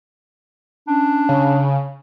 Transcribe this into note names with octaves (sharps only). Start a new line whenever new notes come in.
C#4 D4
C#3